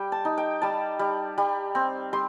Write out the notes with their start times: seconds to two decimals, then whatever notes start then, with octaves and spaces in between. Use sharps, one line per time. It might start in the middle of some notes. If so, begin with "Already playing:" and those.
Already playing: G3 G5
0.12 A5
0.25 D#4
0.38 G5
0.62 G3 A5
0.99 G3
1.38 G3
1.75 C4
2.13 G3 C6